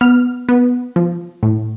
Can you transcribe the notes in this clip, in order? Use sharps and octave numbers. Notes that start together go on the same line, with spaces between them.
B3 F6
B3
F3
A2